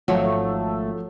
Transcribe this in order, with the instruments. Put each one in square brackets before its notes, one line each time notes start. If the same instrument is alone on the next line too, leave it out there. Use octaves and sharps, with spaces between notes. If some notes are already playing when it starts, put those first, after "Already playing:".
[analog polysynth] G#1 A3 [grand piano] F3 [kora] F#3